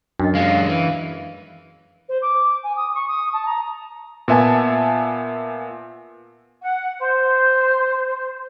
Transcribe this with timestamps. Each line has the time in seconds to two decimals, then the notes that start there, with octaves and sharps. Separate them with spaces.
0.20 F#2 D4 D#5
0.35 F#3 G#3 F5
0.69 E3 F5
2.08 C5
2.21 D6
2.63 G#5
2.76 D#6
2.94 C#6
3.07 D#6
3.33 A5
3.45 A#5
4.28 A#2 B3 E5 G#5 A5
6.61 F#5
7.00 C5